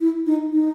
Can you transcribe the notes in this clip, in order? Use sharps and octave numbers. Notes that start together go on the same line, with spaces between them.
E4
D#4
D#4